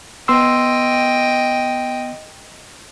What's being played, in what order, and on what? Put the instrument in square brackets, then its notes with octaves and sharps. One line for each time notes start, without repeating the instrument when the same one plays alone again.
[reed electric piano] B3 C6 E6 [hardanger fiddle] D#5 G5